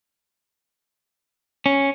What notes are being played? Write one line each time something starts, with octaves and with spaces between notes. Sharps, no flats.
C#4